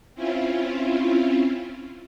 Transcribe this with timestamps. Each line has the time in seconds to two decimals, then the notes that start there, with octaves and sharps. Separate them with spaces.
0.14 C4 C#4 E4 F4